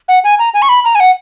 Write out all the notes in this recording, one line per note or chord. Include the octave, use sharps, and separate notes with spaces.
F#5
G#5
A#5
G#5
C#6
B5
A#5
G#5
F#5